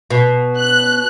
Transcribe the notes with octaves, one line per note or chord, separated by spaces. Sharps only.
B2
F#6